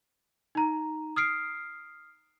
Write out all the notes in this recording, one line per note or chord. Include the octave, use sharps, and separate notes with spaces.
D#4 A#5
D#6 F6 C7 D7